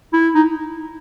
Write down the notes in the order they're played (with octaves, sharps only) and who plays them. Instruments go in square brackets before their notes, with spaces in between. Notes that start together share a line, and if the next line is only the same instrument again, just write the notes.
[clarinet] E4
D#4